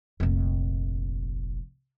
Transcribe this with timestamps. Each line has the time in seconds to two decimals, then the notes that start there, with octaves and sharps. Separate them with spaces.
0.20 F1 A#1